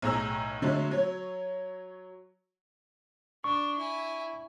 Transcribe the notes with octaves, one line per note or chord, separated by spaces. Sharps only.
B1 A2 G#4 A#5 E6
D3 F#3 G#3 A3
F#3 C#5
D4 C#6
E4 G#5